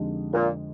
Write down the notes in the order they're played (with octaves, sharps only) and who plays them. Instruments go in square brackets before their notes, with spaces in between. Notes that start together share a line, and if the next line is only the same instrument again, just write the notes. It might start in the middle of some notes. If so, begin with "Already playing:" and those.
Already playing: [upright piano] F2 D3 G#3 D#4 G4
[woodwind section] A#2